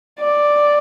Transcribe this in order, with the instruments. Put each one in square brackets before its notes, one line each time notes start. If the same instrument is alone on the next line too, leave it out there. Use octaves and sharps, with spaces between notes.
[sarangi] D5